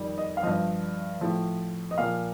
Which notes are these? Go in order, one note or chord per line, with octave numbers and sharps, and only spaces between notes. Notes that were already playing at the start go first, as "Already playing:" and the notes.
Already playing: F2 D#3 G3
D#5
F5
G2 F3 D#5
A2 F3
D#5
A#2 F3 F5